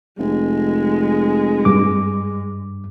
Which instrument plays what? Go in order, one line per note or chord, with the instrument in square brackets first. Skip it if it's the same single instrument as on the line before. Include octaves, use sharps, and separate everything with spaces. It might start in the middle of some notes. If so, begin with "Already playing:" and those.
[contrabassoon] F1 [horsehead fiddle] G#3
[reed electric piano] G2 D6